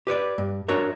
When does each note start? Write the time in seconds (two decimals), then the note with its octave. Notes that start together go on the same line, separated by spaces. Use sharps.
0.07 G4 B4 C#5 D5
0.38 G2
0.68 D4 F#4 A#4 C#5 E5